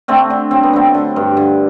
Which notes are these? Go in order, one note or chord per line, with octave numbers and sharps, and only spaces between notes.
D3 A3 C4
D3
F#3 C4
B3
D3 A3 C4
D3
G2
D3